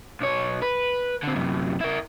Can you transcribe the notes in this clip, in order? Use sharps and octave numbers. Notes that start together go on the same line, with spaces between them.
B1 C#5
B4
D3 C4
F#2 C3
E4 A#4